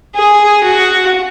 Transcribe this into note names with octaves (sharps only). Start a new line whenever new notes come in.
G#4
F#4